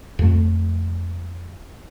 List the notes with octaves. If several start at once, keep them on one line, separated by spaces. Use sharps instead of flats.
F2 A3